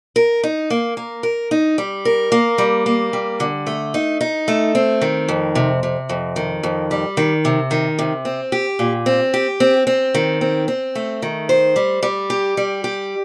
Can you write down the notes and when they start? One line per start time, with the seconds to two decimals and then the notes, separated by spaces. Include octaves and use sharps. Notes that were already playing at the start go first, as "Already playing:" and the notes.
0.16 A#4
0.43 D#4
0.70 A#3
0.97 A#3
1.23 A#4
1.51 D#4
1.78 G3
2.05 A#4
2.32 A#3
2.58 G3
2.86 A#3
3.13 G3
3.40 D3
3.67 A3
3.94 D#4
4.21 D#4
4.48 A3
4.75 C4
5.02 D#3
5.29 F2
5.55 C3
5.83 C3
6.09 F2
6.36 D#3
6.63 F2
6.91 G3
7.17 D#3
7.45 C3
7.71 D#3
7.99 C3
8.25 C4
8.52 G4
8.79 A#2
9.06 C4
9.34 G4
9.60 C4
9.87 C4
10.15 D#3
10.41 C4
10.68 C4
10.95 A3
11.22 D#3
11.49 C5
11.76 G3
12.03 G3
12.30 G4
12.57 G3
12.84 G4